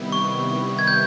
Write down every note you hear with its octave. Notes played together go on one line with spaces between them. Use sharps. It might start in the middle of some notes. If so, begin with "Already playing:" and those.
Already playing: C3 D#3 G3 B3 E4
C#6
G#6
G6